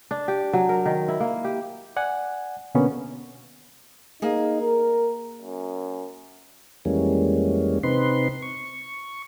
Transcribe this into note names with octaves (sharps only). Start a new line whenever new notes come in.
D4
G4
F#3
A#4
D#3
E4
A#3
G4
D5 F#5 G#5
B2 D3 A#3 B3 C#4
A#3 D#4 G#4
A#4
F#2
F2 E3 G3 G#3 A#3 C#4
C3 C4 D#4 B4 C6
C#6